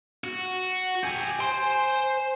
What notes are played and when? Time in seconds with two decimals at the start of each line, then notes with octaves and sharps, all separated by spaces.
0.24 F#4
1.03 G4 G#5
1.40 C5 G#5 C6